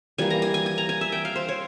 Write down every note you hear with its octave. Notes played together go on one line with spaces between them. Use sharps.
E3 G3 A#3 G#5
A#5
G#5
G#5
G#5
A#5
G#5
E5
G5
F5
C5
C#5